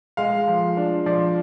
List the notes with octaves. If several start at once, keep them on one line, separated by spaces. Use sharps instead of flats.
G#3 F5
F3
D4
F3 D5